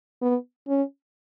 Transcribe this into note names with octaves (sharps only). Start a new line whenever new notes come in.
B3
C#4